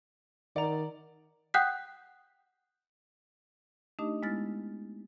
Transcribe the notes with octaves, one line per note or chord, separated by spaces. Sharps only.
D#3 D5 F#5 A#5
F#5 G5 D#6 F#6 G6 B6
A3 D4 D#4 G4 D#5
G#3 B3 E4 F6 A6